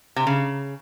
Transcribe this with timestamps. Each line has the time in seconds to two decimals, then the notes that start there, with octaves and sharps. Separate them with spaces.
0.16 C3
0.27 C#3